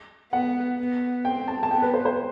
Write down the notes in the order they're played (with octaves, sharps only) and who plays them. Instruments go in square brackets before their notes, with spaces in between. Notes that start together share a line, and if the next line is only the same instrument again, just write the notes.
[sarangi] B3 [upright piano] F#5
[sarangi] B3
[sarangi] C4 [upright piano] G5
[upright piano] A5
A5
[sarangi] B3 [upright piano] G5
[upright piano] B4
C5
C5